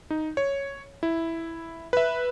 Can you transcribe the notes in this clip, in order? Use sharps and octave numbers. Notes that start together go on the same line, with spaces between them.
D#4
C#5
E4
B4 E5